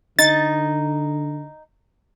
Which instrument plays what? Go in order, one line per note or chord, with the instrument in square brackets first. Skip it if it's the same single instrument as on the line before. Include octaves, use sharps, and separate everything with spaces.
[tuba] D3 [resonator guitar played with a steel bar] D#4 [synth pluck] A6